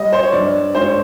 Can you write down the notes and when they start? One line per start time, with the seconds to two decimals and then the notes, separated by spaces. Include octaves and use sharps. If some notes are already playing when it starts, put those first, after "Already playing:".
Already playing: G3 D#5
0.13 C5
0.23 C#5
0.33 G2 D5
0.75 G#2 C5
0.85 C#5